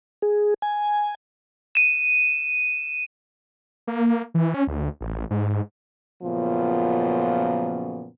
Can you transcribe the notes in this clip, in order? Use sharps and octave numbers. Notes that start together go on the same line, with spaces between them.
G#4
G#5
D#7 E7
A#3
E3
C#4
D2
A1
A1
G#2
F#2 A#2 C#3 F3 B3